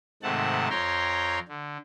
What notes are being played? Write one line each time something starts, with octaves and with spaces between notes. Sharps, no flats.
G#2 C3 D#3 A3 F#5 A5
F2 C#5 G5 A#5 C6
D3